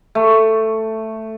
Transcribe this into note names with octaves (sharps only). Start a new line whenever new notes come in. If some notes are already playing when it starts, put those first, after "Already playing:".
A3